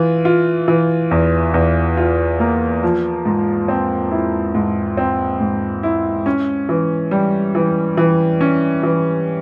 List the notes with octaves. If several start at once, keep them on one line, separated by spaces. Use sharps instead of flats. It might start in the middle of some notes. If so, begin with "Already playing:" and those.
Already playing: E3 F4
F4
E3
E2
E2
F4
A#3
F3
G#2
C4
E4
G#2
C4
G#2
E4
C#4
E3
G3
E3
E3
C#4
E3